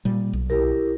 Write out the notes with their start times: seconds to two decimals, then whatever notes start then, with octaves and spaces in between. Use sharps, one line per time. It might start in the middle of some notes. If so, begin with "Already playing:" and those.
0.05 A#2 G3
0.33 B1
0.50 E4 G4 A#4